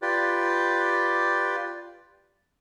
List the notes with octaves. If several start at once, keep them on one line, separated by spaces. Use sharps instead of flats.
F4 G4 B4 D5